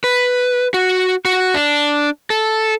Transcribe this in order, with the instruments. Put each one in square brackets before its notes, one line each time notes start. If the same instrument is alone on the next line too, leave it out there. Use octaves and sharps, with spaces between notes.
[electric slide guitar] B4
F#4
F#4
D4
A4